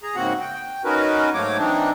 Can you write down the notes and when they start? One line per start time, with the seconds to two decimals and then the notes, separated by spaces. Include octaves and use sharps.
0.03 G#4 A#5
0.16 G#2 C#3 A#3 C4 F#4 F#5
0.40 G5
0.85 C#4 D#4 F#4 A#4 B4
1.34 G#2 F#3 A3 A#3 C#5 D6
1.58 E3 C4 D4 D#4